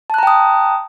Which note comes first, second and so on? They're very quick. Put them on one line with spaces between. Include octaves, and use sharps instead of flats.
A5 F#6 A#5 G5 D#6